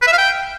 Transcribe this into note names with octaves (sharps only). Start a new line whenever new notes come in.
B4
E5
F5
G5